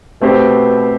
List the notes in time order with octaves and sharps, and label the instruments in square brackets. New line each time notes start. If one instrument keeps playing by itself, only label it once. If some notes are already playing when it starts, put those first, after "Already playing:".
[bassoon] B2 [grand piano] A3 C4 G4 C5